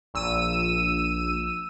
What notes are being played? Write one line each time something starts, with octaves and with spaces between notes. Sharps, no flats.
A#1 E6 D#7